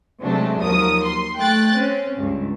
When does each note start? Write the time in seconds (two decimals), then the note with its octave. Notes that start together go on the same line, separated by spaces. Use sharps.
0.22 C3 F#3 G#3 A3 D4
0.61 D#2 F3 F#3 A#4 D#6
1.04 C6
1.36 A3 G5 F#6 A6
1.75 C4 C#4
2.17 C#2 G2